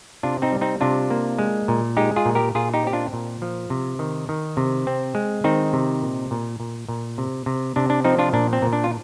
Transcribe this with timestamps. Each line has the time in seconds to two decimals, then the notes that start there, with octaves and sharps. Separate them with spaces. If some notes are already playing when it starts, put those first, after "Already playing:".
0.23 C3 D4 F4
0.42 C4 D#4
0.52 G3
0.61 C4 D#4
0.81 C3 D4 F4
1.10 A#3
1.38 G#3
1.68 A#2
1.97 G#3 D#4 G4
2.16 F4 G#4
2.25 A#2
2.35 G4 A#4
2.55 A#2 F4 G#4
2.74 D#4 G4
2.84 C4 G4
2.93 D4 F4
3.13 A#2
3.42 F3
3.70 C3
3.99 D#3
4.29 D#3
4.57 C3
4.87 C4
5.15 G#3
5.44 D#3 C4 D#4
5.73 C3
6.02 A#2
6.31 A#2
6.60 A#2
6.88 A#2
7.18 C3
7.46 C3
7.76 C3 D4
7.90 D4
8.04 F3 C4 D#4
8.19 D4 F4
8.33 A#2 D4
8.53 C4
8.62 A#2
8.73 D4
8.84 F4